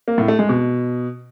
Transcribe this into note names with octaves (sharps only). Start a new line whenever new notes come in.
A#3
A2
A3
G#3
B2